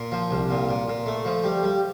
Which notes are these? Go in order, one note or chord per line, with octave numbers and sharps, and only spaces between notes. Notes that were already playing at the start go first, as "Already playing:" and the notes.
Already playing: A#2
F3
C2
A#2
A#2
A#2
A3
F3
G3
G3